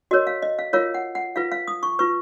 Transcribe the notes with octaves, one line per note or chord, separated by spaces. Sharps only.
F#4 A#4 C#5 D#5
F5
D#5
F5
F4 A#4 C#5 F5
F#5
F#5
F4 B4 F5
F5
D#6
C#6
F4 B4 C#6